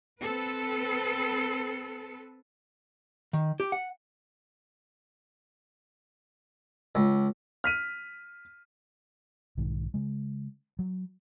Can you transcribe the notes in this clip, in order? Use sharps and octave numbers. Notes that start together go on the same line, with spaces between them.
C4 A4 B4
D#3
G4
F#5
C#2
F6 B6 D#7
B1 G#2 D#3
C#3 G#3
F#3